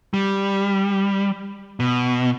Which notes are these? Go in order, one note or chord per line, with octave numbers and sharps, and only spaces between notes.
G3
B2